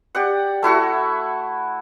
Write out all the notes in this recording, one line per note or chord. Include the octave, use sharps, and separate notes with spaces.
G4 D5 F#5
A3 E4 F#4 C#6